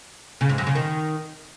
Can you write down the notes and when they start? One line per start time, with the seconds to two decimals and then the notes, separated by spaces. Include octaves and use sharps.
0.41 C#3
0.49 G#2
0.58 F#2
0.67 C#3
0.75 D#3